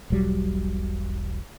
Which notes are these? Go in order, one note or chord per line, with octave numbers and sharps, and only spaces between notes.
E1 B1 F#3 G3